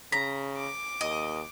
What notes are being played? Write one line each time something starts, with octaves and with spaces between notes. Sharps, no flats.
C#3 A#5 B6
D6
D#2 D#5